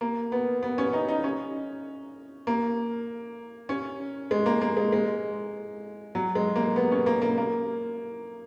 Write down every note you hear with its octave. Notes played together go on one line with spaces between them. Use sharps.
A#3
B3
B3
C#4
D#4
D#4
C#4
A#3
C#4
G#3
A#3
A#3
G#3
G#3
F#3
G#3
A#3
B3
C#4
A#3
A#3
A#3